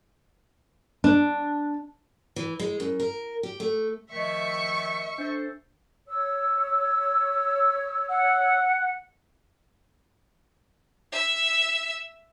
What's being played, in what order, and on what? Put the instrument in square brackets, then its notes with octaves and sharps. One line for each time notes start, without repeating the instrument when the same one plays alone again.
[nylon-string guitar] D4
[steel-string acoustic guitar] E3
G#3
F#2
A#4
G4
A3
[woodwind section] D#3 F3 A3 [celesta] D#5 B6 [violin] E5 C#6
[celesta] D4 [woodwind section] A4 C5
[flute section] C#5 E6
[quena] F#5
[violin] E5